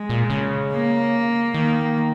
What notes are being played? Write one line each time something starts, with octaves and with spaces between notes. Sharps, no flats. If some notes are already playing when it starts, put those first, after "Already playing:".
Already playing: G#3
A#2
C#3
A#3
D#3 A#3